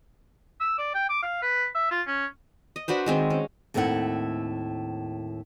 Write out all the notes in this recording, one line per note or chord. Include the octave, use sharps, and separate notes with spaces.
E6
D5
G5
D6
F5
B4
E5
F4
C#4
D#5
D4 F#4 B4 C5
D#3 G#3 C4
C#4
D#2 A2 A3 C4 E4 F#5